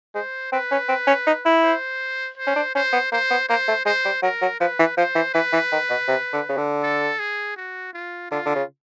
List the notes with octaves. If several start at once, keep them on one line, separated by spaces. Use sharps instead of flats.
G#3 C5
C4 B4
C#4
C4
C#4
D#4
E4
C5
C5
C#4
D4
C#4 C5
B3
A#3 C5
B3
A#3 C5
A3
G#3 C5
G3
F#3 A#4
F#3
F3 B4
E3
F3 C5
E3
E3 B4
E3
D#3
B2
C3
D3
C#3
D3
A4
G#4
F#4
F4
D3 F4
D3
C#3